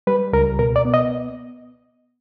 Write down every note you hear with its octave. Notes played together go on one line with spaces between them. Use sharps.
G3 B4
C#2 A#4
B2 A#4
D5
B3
D#5